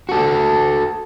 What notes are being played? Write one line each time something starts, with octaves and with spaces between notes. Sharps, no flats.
F#4 A4